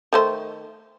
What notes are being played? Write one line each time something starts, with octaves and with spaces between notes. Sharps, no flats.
D#3 A3 C5